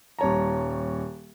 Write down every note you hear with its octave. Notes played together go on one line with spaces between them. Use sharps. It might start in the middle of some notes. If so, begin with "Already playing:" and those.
D#1 G3 C#5 A5 A#5